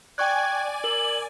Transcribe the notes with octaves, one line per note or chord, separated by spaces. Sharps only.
D5 G5 G#5 C#6 F#6 G#6
A#4 F#7